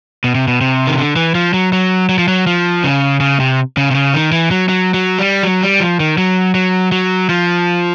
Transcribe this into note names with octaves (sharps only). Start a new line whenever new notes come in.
B2
C3
B2
C3
D#3
D3
E3
F3
F#3
F#3
F#3
F3
F#3
F3
C#3
C#3
C3
C#3
C3
C#3
D#3
E3
F#3
F#3
F#3
G3
F#3
G3
F3
D#3
F#3
F#3
F#3
F3